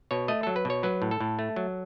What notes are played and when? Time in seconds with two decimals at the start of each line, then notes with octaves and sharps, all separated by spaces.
0.11 B2 C#5
0.28 A3 D#5
0.43 F#3 A4
0.56 B4
0.65 B2 C#5
0.83 F#3 B4
1.02 A2
1.11 A4
1.21 A2
1.39 A3
1.56 F#3